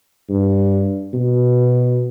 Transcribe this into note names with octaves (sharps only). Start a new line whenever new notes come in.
G2
B2